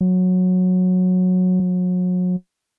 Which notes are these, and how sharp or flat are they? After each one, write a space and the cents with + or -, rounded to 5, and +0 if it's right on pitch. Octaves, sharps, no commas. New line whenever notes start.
F#3 -15
F#3 -35